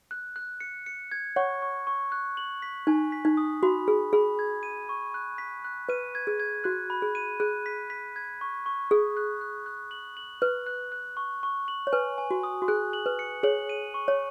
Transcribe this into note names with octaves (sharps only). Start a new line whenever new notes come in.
F#6
F#6
C#7
C#7
G#6
C#5 F#5 C#6
C#6
C#6
F#6
F#7
B6
D#4 G#5
B6
D#4
D#6
F#4 B5
G#4 B5
G#4 B5
G#6
D#7
C#6
F#6
B6
F#6
B4 D#7
G#6
G#4
G#6
F#4 F#6
B5
G#4
D#7
G#4 F#6
B6
B6
G#6
C#6
C#6
G#4 D#6
F#6
F#6
F#6
F#7
F#7
B4 F#6
F#6
F#6
C#6
C#6
F#7
C#5
B4 G#5
G#5
F#4
D#6
F#4
G#4 F#6
F#7
B4
C#7
G#4 C#5 F#7
D#7
C#6
C#5